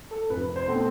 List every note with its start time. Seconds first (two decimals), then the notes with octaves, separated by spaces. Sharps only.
0.11 A4
0.30 F1 B4
0.56 C5
0.68 B2 A3 C4